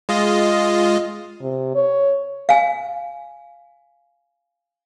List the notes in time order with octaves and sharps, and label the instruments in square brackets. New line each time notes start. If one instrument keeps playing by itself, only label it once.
[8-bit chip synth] G#3 F4 D#5
[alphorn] C3
C#5
[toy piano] F5 G#5